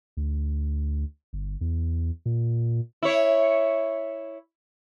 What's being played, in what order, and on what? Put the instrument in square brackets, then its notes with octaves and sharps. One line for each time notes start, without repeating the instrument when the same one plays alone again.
[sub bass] D2
G1
E2
A#2
[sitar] E4 C#5